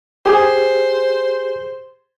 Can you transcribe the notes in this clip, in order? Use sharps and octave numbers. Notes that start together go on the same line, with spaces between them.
G4 G#4 C5